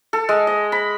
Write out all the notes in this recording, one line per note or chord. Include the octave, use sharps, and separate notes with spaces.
A4
G#3
D#5
B5